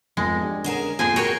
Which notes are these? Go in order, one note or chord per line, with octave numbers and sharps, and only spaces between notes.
F1 B1 F2 G#3
D4 G4
D3 C#4 G#4 A#4 F#5 E7
F2 A#2 A#3 G#4 C5 G#5 A#6
F#4 G#4 A#4 C#5 G5 F#6 F7